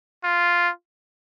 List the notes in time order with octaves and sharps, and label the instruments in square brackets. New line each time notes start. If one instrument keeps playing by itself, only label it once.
[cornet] F4